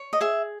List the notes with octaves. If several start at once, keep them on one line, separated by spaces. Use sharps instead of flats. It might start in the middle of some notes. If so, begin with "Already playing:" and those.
Already playing: C#5
D#5
G#4 E5